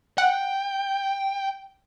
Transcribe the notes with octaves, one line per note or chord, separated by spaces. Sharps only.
F#5 G5